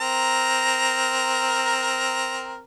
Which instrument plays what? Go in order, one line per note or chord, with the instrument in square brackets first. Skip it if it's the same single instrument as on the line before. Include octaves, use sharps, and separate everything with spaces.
[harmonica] C4 A#4 A#5